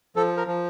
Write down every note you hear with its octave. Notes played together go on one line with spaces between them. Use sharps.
F3 A4
A#4
F3